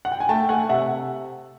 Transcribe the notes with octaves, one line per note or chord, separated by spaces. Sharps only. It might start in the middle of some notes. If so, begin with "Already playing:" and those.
F#5
G5
G#5
A3 G5 A5
A3 F#5 G#5
C3 E5 F#5